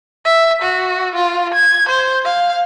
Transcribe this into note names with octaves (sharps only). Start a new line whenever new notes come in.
E5
F#4
F4
G#6
C5
F5